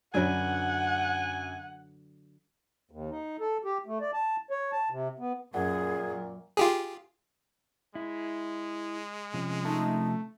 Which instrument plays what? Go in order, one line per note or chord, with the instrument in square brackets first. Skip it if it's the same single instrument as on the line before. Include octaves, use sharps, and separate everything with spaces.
[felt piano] F#2 [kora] D3 F#3 B4 [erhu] F#5 [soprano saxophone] G#5
[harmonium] D#2
D#4
A4
G4
A3
D5
A5
C#5
A5
C3
B3
[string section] F#2 [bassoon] A#2 [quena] G#4 [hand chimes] F#5
[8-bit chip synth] F4 G4 G#4
[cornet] G#3 [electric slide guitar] E4
[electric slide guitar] C3 F3 C#4
[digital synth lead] A3 [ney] D#4